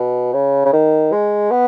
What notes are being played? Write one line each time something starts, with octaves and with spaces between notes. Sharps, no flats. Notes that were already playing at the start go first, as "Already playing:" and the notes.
Already playing: B2
C#3
C#3
D#3
G#3
B3